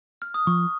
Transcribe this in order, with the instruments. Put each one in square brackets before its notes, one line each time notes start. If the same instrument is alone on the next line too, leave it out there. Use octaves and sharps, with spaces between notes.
[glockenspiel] F6
D#6
[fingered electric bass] F3 [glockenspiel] C#6